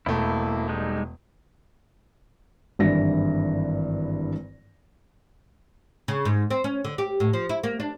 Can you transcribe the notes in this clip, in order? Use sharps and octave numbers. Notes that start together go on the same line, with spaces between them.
E1 A3 A#3 E4
G3 G#3 D#4
G#1 G2 E3 E4 A#6
C#3
G#2
C4
C#4
D3
G4
A2
F3
E4
A#3
D4